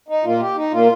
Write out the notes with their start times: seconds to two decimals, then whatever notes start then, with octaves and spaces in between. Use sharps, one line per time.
0.08 D#4
0.24 A#2 A#3 F4
0.40 G4
0.56 D#4
0.71 A#2 A#3 F4